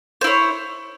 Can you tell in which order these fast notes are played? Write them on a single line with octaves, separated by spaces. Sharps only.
C5 E4 C#5